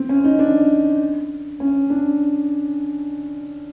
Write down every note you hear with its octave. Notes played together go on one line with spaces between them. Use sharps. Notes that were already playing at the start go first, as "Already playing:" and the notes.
Already playing: C4
C#4
D#4
D4
C#4
D4